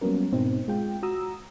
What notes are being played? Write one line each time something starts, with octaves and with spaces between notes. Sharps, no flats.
F#3 G3 A#3 B3 C#4 A#4
G#2 B2 C4 D#4
G#3 F4 G5
F#4 A#5 D#6 E6